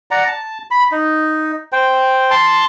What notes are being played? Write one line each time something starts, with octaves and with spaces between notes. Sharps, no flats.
D5 F#5 A#5
A5
B5
D#4
C5 G5
A5 C6